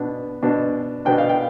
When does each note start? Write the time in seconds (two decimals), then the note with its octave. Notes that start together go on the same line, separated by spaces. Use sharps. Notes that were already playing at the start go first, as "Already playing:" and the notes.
Already playing: B2 B3 D4
0.42 B2 B3 D4
1.05 B2 B3 D4 G5
1.18 F5
1.29 G5